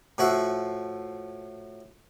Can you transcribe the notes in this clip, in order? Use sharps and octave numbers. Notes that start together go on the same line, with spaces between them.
A2 F3 F#4 E5 F#5